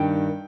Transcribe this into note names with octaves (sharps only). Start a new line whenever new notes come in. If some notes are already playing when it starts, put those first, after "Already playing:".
Already playing: G2 D#3 G5